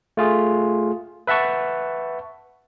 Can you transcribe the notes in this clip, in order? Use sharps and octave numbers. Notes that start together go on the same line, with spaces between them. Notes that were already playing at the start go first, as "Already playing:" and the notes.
A3 F4 G#4
B4 E5 F#5 A5 C#6